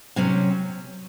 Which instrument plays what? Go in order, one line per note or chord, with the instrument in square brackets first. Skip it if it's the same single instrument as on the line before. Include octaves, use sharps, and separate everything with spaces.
[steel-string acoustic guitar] C3 F#3 C#4